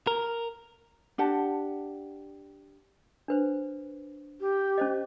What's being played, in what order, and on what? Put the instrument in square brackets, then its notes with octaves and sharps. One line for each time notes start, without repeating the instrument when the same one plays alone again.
[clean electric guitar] A#4
[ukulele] D4 G4 F#5 A5
[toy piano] D4 B4 C5
[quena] G4
[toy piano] C#4 C5 D#5